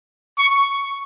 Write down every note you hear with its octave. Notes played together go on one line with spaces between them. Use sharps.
C#6